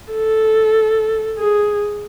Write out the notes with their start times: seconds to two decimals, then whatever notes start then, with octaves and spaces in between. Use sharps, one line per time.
0.12 A4
1.38 G#4